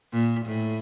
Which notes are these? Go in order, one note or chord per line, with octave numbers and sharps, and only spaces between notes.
A#2
A2